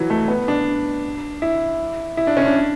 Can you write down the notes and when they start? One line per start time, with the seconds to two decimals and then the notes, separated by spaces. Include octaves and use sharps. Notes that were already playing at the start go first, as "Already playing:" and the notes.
Already playing: E3 F#3
0.10 A3
0.28 B3
0.48 D4
1.42 E4
2.17 E4
2.27 D4
2.37 C#4
2.46 D4